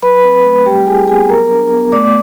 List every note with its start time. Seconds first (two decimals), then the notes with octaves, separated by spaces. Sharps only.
0.02 F#3 B4 B5
0.23 C4
0.45 A3
0.66 G3 G4 G5
0.87 E4 G#4 G#5
1.07 B3 G#4 G#5
1.29 F#3 A#4 A#5
1.50 D4
1.71 B3
1.92 A3 D5 D6